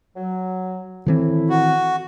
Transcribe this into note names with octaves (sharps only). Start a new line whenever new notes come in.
F#3
A2 D#3 E3 C4 E4
F#4